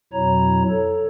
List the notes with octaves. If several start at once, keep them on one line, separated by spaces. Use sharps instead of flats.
F2 B2 F#3 E4 C#5 A#5
A4 C#5